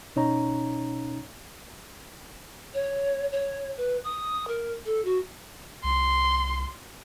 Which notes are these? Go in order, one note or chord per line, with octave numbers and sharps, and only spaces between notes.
B2 C#4 D#4 C#5 A#5
C#5
C#5
B4
D#6
A#4
A4
F#4
C2 C6